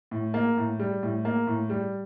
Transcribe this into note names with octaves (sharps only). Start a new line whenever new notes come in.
A2
A#3
A2
G3
A2
A#3
A2
G3